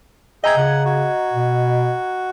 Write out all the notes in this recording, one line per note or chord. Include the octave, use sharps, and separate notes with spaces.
G#4 D#5 E5 G5 A#5 G#6
C#3 F#5
F#4
B2